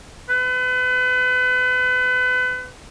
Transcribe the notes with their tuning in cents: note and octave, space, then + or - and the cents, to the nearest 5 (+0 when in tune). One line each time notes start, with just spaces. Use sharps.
B4 +35